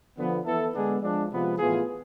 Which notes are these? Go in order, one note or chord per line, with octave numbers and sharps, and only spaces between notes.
D3 F3 B3
E3 B3 E4 A4
D3 G#3 B3 D4 G#4
F3 G#3 D4
C3 F3 G#3 B3 F4
A2 E3 B3 F4 G#4